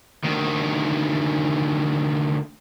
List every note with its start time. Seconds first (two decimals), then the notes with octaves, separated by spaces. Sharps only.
0.24 D2 D#3